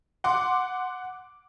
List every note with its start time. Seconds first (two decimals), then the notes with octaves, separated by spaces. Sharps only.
0.24 F#5 C6 D6